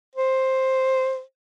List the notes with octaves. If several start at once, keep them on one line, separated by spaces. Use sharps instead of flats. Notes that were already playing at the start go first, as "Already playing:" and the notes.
C5